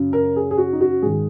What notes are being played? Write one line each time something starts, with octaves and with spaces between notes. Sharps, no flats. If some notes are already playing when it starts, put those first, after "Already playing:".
Already playing: F#2 C#3
A#4
G#4
G#4
F#4
D#4
F#4
G#2 D#3 G#4